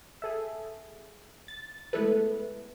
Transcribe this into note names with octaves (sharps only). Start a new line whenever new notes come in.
G#4 A4 E5
A6
G#3 A3 B3 E4 A4 B4